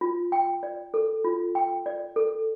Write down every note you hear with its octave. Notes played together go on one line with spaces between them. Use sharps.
F4
G5
D5
A4
F4
G5
D5
A4